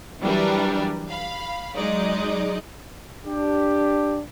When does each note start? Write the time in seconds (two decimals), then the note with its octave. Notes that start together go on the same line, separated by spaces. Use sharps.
0.22 E3 F#3 G3 D4 A#4 B4
1.08 F5 B5
1.76 F#3 G#3 D#4 D5 D#5
3.26 D4 G4